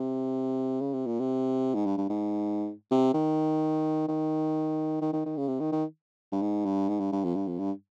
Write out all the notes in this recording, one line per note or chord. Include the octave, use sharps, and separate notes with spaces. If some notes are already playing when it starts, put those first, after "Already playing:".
Already playing: C3
C#3
C3
A#2
C3
G#2
G2
G2
G#2
C3
D#3
D#3
D#3
D#3
D#3
C#3
C3
D#3
D#3
G2
G#2
G2
G#2
G2
G2
F2
G2
F2
G2